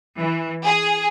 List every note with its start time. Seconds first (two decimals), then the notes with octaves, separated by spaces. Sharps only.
0.17 E3
0.64 G#4